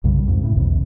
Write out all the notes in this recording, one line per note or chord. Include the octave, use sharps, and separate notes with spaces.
B1 F#2 C#3 G3
F2 G#2
A2 C#3
B1 E2 B2